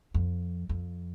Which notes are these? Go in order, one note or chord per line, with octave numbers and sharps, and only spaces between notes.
F2
F2